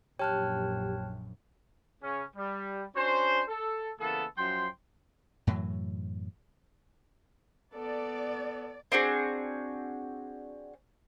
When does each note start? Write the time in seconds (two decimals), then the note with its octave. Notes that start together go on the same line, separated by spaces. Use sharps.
0.19 A#1 F#2 G4 C#5 G5 A5 F6 F#6
2.02 C#3 C#4
2.35 G3
2.96 C#4 D4 F#4 C5
3.48 A4
3.99 C#3 E3 A#3 B3 A4
4.37 F#2 F3 G5 C6
5.47 F#2 A2 E3 F#3
7.74 B3 A4 D5
8.92 C4 D4 F#4 G#4